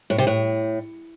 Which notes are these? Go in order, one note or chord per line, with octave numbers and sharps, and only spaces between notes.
A2
C3
A2